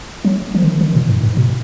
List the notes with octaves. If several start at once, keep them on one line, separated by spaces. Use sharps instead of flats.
F#3
F3
D#3
D#3
A#2
G#2
G#2
B2